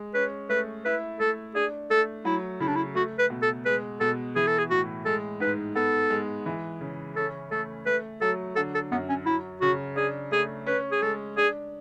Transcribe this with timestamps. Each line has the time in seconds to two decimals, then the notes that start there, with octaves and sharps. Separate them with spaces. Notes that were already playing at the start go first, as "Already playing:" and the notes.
Already playing: G#3
0.14 C#4 B4
0.50 A3 B4
0.85 E4 B4
1.20 A3 A4
1.55 D4 G#4
1.90 A3 A4
2.25 F#3 E4
2.60 C#3 E4
2.67 D4
2.76 E4
2.95 A3 F#4
3.19 B4
3.30 B2
3.42 A4
3.65 G#3 B4
4.00 B2 A4
4.36 E3 G#4
4.47 A4
4.58 G#4
4.70 A2 F#4
5.05 G#3 A4
5.40 G#2 B4
5.75 B3 A4
6.10 G#3
6.46 E3
6.81 C#3
7.16 C#4 A4
7.51 A3 A4
7.86 A3 B4
8.21 F#3 A4
8.56 D3 A4
8.74 A4
8.91 F#2 B3
9.09 C#4
9.26 F#3 E4
9.61 C#3 F#4
9.96 D4 G#4
10.31 A3 G#4
10.66 C#4 B4
10.92 G#4
11.02 G#3 A4
11.37 D4 G#4